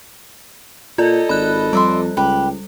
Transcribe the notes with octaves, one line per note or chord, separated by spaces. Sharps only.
A#2 F4 A4 D5 D#5
G#1 B5 F#6
F2 G3 D5 E5 C6
C#2 G4 B4 B5